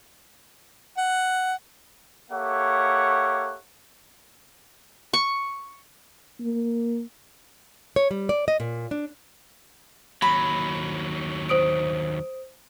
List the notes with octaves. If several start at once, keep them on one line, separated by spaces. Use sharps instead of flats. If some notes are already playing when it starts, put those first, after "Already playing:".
F#5
A#3 G4 A4 C#5 E5 F#5
C#6
A#3
C#5
G3
D5
D#5
A#2
D4
D#2 F#3 B5
C5 D#6 D7